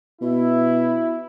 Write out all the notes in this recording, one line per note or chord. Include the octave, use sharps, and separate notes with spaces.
B2 E4